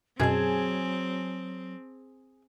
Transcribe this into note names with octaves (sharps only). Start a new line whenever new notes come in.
F#2 B2 F#3 C4 G#4 A5